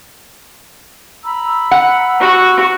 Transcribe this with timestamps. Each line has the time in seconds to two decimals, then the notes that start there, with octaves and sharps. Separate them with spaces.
1.24 A#5 B5 E6
1.71 F#5
2.21 F#4